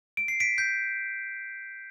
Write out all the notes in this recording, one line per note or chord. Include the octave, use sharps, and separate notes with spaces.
D7
C7
B6 D7
G6 B6